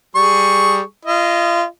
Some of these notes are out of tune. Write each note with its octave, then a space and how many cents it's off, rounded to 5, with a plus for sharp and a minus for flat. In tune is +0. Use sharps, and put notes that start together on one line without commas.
G3 +5 G#4 +15 C#6 +0
F4 -30 D#5 +0